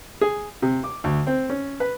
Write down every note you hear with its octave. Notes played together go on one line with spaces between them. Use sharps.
G#4
C3
D6
D2
C4
C#4
B4